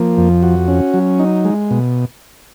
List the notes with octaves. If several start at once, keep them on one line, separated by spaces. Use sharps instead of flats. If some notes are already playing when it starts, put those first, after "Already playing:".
Already playing: F3 A#3
F2
F#4
C#4
F#3
D#4
G#3
B2